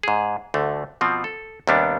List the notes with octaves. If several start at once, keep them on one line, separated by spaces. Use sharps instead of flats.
G#2 G#4
D2 D3 A3
B2 F3 C4
A4
D#2 C3 G3 B3 D4